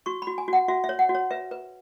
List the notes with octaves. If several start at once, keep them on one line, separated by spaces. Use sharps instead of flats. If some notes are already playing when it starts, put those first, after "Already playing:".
F#4 C#6
F#4 B5
G#5
F#4 F#5
F#4 E5
E5
C#5
F#5
F#4
C#5
B4 E5
B4